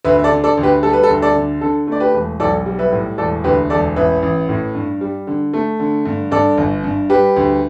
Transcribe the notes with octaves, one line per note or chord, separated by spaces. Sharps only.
D2 B4 E5
E5
A4 D5
D3
A4 D5
D2
G4 B4
G3 A4
B4
A4
D2
A4 D5
D3
D3 A4
A3 D5
G4 B4
E1
B1 A4 D5
G3
B4 E5
A2
E1 A4 D5
D2 G4 B4
E1 A4 D5
A1 B4 E5
A1
A2
G2
G3
D3
A3
D3
G2
G2 A4 D5
G1
G2
G3 G4 B4
D2